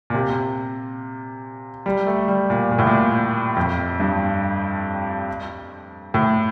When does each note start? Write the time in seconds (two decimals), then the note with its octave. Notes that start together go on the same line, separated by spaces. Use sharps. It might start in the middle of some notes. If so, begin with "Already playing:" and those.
0.10 A#2
0.14 C3
1.86 G3
2.07 A3
2.28 G3
2.50 A#2
2.71 A#2
2.79 A2
2.87 A#2
3.57 F2
4.00 G2
6.14 A2